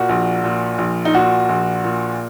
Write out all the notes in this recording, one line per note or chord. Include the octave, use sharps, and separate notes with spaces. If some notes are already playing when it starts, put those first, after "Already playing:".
Already playing: A#2 F#4
A#1
A#2
A#1
D#4
A#2 F#4
A#1
A#2